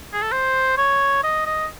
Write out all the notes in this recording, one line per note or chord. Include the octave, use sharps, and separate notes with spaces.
G#4
A4
C5
C#5
D#5
D#5